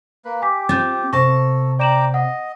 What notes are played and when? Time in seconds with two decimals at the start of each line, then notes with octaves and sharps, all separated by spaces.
0.25 A#3 B4
0.42 G4 G#5 D6 B6
0.69 C4 F4 G6 A6
1.13 C3 A4 A5 C#6 A#6
1.79 D5 G5 A#5 D6 E7 F#7
2.14 D#5 F#5